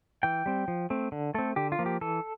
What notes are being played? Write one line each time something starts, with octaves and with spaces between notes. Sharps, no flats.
E3 G5
G3 C4
F3
A3 C4
D3
A3 C4 A4
D3 G4
F4
F3 A#3
G4
E3 A4